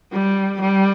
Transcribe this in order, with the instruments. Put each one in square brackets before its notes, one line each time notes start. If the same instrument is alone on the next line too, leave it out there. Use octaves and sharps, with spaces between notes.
[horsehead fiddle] G3
G3